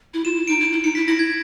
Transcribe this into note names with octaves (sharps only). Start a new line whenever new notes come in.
E4
F4 E7
E4
D#4 D7
E4
E4
D#4 C#7
E4 B6
E4 A#6
G#6